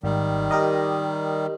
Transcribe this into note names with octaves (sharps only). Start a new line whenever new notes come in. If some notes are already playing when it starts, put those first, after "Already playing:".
G#1 D#3 G3
G4 A#4 D#5